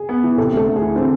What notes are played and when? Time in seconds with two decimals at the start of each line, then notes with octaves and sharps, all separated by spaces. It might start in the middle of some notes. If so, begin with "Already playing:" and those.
Already playing: G#4
0.09 B3
0.24 E3
0.37 C3 A4
0.52 D2
0.57 A4
0.67 D2
0.76 G#4
0.81 E3
0.95 D3 C4